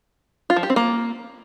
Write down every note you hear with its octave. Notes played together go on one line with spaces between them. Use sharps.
F4
F3
G4
C4
A#3